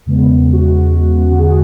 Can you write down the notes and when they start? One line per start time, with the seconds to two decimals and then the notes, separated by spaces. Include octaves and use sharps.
0.06 E2 C#3 G#3 B3
0.53 F#4
1.31 E2 D3 G#3 F#4
1.39 G#4
1.46 F#4